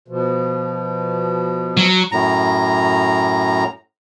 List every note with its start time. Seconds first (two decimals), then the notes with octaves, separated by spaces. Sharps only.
0.08 B2 F3
1.77 F#3
2.12 F#2 A2 A#5